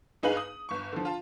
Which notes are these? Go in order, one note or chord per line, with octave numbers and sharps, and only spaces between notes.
G1 D#4 G#4 B4 F5 F#7
D#6
G1 C#6
D3 F3
F4 A5